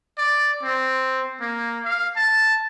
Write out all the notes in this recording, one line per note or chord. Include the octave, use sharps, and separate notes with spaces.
D5
C4
A#3
F5
A5